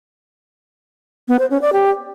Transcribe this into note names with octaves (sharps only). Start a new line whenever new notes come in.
B3
C5
C#4
D5
G4